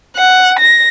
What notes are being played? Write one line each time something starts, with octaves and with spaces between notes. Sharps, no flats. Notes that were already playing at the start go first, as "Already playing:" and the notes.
F#5
A#6